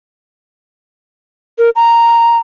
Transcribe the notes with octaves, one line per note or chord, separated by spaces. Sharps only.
A#4
A#5